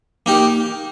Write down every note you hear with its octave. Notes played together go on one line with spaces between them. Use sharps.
A#3 D#4 G4